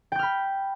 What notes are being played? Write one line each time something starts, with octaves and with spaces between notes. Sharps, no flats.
G5 B5 F6 G6